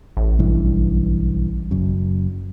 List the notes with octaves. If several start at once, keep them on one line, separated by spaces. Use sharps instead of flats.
A1
B1 G2 E3
F#1 F#2